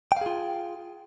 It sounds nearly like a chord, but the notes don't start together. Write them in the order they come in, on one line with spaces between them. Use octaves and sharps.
G5 F5 G#4 F4